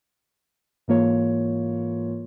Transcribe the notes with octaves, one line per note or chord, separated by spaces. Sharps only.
G#2 E3 A#3 F4 C#5